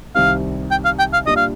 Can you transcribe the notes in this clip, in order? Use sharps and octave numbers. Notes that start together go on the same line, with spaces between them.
C2 C3 D#3 G3 C4 F5
G5
F5
G5
F5
A#2 G3 D4 F4 D#5
F5